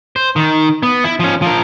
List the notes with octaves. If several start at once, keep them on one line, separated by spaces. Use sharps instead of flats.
C5
D#3
B3
E4
F3 C#4
F3 A#4